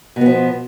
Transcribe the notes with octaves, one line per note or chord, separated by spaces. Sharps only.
B2 F3 B3